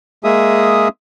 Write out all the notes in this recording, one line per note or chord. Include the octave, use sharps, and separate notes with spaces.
G#3 A#3 G#4 E5 D#6